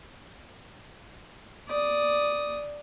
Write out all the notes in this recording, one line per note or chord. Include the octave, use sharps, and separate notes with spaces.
D5 D#6